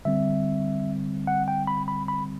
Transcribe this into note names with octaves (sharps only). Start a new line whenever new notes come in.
D3 G3 C4 E5
F#5
G5
B5
B5
B5